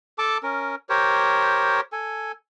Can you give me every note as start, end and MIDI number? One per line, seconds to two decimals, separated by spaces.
0.18 0.38 69
0.18 0.38 81
0.18 0.38 86
0.43 0.75 61
0.43 0.75 70
0.89 1.81 67
0.89 1.81 70
0.89 1.81 72
0.89 1.81 73
1.92 2.32 69
1.92 2.32 80